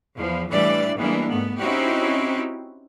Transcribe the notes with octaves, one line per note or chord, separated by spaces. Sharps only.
E2 F3
A2 E3 G3 D4 D5
E3 G3 G#3 A#3 B3 D4
G#2 A3 B3
C4 C#4 D#4 E4 F#4 G4